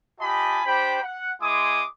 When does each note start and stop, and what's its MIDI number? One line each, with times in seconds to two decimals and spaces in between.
0.20 0.61 65
0.20 0.61 67
0.20 0.61 75
0.20 0.61 80
0.20 0.61 81
0.20 0.61 83
0.65 1.00 62
0.65 1.00 67
0.65 1.00 72
0.65 1.00 79
0.65 1.00 83
1.03 1.31 78
1.41 1.83 56
1.41 1.83 64
1.41 1.83 80
1.41 1.83 84
1.41 1.83 86
1.41 1.83 87